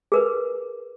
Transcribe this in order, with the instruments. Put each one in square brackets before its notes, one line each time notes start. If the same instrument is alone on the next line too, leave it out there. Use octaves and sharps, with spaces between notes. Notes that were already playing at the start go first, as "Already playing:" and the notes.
[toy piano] G#4 A#4 B4